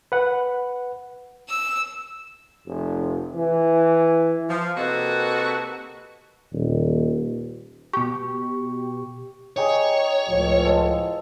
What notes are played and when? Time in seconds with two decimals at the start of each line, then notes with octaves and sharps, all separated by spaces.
0.12 B4 F#5
1.49 E6
2.66 F1
3.35 E3
4.48 F3
4.76 C3 A#3 D#4 F#4 A4 B4
6.53 D#1
7.93 B2 G4 C#6
9.56 D#4 G4 G#4 C#5
10.29 C#2 A2 F3
10.64 G#3 A4